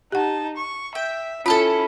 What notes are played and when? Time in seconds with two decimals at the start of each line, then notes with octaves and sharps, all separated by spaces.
0.12 D#4 G4 F#5 A5
0.57 C#6
0.95 E5 G5
1.46 C#4 E4 F4 A4 A5 B5